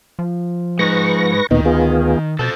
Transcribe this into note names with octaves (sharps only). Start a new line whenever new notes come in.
F3
G#3 D#4 B4 C#6 A#6
D2 A#2 D#3 B3 D#4
B3 F4 G#4
B2 A4 C5 A5